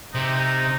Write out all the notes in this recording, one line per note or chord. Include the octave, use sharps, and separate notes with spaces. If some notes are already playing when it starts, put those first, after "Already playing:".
C3 D#4